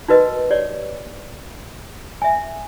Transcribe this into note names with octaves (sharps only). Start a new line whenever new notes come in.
D#4 F#4 A#4 B4 D#5
G4 C#5 D5
E5 G#5